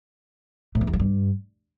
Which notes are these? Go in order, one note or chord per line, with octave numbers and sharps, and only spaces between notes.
A2
E3
E2
F3
G2